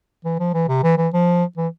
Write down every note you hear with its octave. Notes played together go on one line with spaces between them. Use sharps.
E3
F3
E3
C3
E3
E3
F3
E3